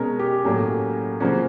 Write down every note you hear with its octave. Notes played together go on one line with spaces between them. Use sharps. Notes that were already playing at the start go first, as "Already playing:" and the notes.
Already playing: B2 G#3 C#4 A#4
G4
A2 F#3 A#3 C#4
C#3 F3 A#3 C#4 F#4